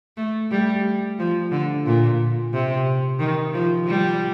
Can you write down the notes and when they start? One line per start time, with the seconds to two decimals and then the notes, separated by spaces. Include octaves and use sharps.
0.17 A3
0.51 G3
1.19 F3
1.52 D3
1.86 A#2
2.53 C3
3.19 D#3
3.54 F3
3.87 G3